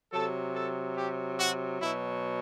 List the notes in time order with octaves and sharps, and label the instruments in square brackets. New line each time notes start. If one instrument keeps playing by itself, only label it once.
[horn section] C3 F#3 A4
A4
G4
F#4
B2 F#3 E4